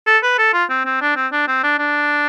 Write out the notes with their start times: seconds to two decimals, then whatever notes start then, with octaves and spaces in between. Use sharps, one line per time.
0.07 A4
0.23 B4
0.38 A4
0.53 F4
0.70 C4
0.86 C4
1.01 D4
1.16 C4
1.32 D4
1.48 C4
1.63 D4
1.79 D4